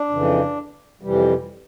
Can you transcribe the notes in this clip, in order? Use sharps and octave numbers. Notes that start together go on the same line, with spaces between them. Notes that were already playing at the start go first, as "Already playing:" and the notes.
Already playing: D4
F2 C#3 E3
F2 C3 E3 G3